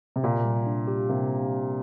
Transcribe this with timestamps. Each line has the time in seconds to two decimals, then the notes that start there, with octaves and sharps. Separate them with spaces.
0.16 C3
0.23 A#2 A#3
0.44 G3
0.66 D4
0.87 G4
1.09 C3 A#3